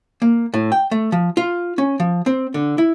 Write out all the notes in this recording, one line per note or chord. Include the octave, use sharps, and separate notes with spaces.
A#3
A2
G5
A3
F3
F4
C#4
F3
C4
D3
E4